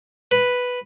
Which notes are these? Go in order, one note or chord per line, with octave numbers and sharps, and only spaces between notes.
B4